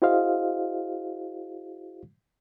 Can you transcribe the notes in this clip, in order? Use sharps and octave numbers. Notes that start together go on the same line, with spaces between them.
E4 F#4 G#4 C5 D#5 F5